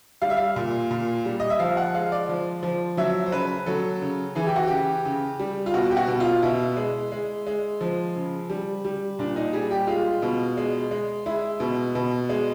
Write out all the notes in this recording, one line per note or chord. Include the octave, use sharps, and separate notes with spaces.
G3 F5
E5
F5
A#2
A#2
G3
D#5
E5
F3 F5
F#5
G#3 F5
D5
F3
F3
F#3 E5
C5
C#3 B4
F#3 A4
C#3
E3 G#4
G4
F#4
C#3 G4
C#3
G3
F4
B2 F#4
G4
F#4
B2
F4
B2 E4
G#3
G#3
G#3
F3
C#3
G3
G3
A#2 D4
D#4
G3 G#4
G4
G#3 F4
B2
G#3
G#3
G#3 E4
B2
B2
G#3